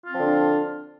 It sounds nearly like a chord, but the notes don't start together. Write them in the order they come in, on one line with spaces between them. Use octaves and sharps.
F4 C4 F3 D3 D4